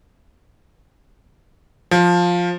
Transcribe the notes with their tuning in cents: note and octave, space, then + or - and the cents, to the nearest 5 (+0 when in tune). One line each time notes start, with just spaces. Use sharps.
F3 +10